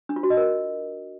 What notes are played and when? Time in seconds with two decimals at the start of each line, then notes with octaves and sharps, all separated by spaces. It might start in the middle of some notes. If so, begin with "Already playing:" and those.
0.09 D4
0.16 F4
0.23 F#4
0.30 D#5
0.37 A#4